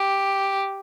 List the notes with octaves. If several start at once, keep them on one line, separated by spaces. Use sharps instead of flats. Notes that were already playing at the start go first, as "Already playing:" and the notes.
Already playing: G4